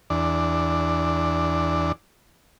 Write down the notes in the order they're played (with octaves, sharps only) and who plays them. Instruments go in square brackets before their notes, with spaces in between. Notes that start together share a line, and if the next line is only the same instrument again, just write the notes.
[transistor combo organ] E2 D4